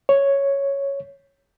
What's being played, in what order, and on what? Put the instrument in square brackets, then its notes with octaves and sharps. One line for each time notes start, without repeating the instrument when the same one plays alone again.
[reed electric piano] C#5